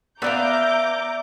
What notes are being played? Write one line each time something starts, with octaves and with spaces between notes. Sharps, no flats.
B3 D4 D5 E5 F5 A#5 D6 G6